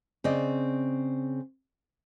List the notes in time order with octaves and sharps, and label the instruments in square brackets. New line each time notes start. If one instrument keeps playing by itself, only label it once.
[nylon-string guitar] C#3 C4 D5 D#5